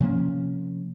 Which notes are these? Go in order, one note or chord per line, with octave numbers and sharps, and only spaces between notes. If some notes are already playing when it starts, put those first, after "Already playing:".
C3 F3 A#3 C#4